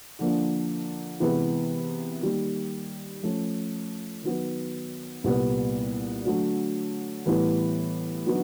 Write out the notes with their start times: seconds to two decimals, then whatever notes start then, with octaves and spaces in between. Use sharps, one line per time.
0.19 D3 F3 A#3 D4
1.20 C3 E3 G#3 B3 E4
2.22 D#3 G3 A#3
3.23 F3 A3 C#4
4.23 D#3 F#3 B3
5.24 C2 A#2 G3 B3
6.25 D3 F#3 A3
7.26 A2 E3 G3 B3 E4
8.26 D3 F#3 B3 D#4 F#4